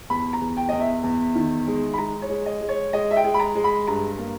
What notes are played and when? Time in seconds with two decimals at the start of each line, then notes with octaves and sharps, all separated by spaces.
0.10 E2 B5
0.33 A#5
0.41 E2
0.57 G5
0.69 E2 D#5
0.80 E5
1.03 E2
1.35 D#3
1.67 G#3
1.94 B5
1.98 G#3 A#5
2.22 C#5
2.30 G#3
2.46 D#5
2.61 G#3
2.69 C#5
2.93 G#3 D#5
3.11 E5
3.16 G5
3.24 G#3
3.34 B5
3.40 A#5
3.55 G#3
3.64 B5
3.87 G2 A#5
4.18 A#3